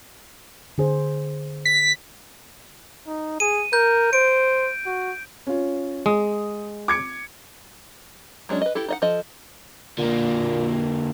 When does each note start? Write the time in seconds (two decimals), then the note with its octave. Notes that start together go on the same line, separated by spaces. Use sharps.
0.78 D3 G#4 C5
1.65 B6
3.07 D#4
3.40 G#4 D#7
3.73 A#4 G6
4.13 C5 D7
4.86 F#4
5.47 C#4 F4
6.06 G#3 D#6
6.88 D6 G#6 C#7
8.49 F#3 G#3 C#4 D4
8.61 B4 D#5
8.75 E4 G4 A4
8.88 D#4 D#5 F#5
9.02 F3 A4 D#5
9.98 A#2 D3 A#3